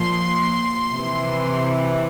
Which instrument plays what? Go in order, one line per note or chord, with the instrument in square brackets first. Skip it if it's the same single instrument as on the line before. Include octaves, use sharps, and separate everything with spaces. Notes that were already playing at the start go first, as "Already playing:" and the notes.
Already playing: [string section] A#2 F3 C6
C3 E3